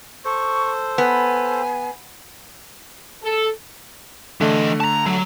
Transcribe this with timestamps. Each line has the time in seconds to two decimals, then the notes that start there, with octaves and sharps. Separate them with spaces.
0.25 A4 C5 C#6
0.98 B3 G#5
3.22 A4
4.41 D3 E3 A3 D#5
4.80 A5 A#5
5.06 F#3